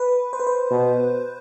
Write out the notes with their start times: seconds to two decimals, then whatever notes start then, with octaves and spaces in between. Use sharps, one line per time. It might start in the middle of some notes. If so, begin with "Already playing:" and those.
Already playing: B4
0.33 C5
0.40 B4
0.47 C5
0.71 B2